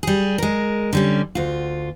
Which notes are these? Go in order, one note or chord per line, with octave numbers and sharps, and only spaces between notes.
G3 G#4
G#3 A#4
D3 G3 C#4
D2 F4